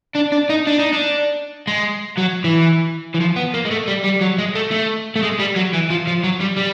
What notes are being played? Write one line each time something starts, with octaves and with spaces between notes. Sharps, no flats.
D4
D4
D#4
D4
D#4
D4
G#3
F#3
E3
E3
F3
B3
A#3
G#3
A3
G3
G3
F#3
G#3
A3
A3
A3
G#3
G3
F#3
E3
F3
F3
F#3
G3
G3